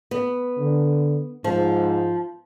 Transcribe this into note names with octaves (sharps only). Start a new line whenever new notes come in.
B3
D3
G#2 F3